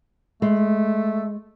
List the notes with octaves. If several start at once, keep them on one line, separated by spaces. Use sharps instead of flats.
G#3 A3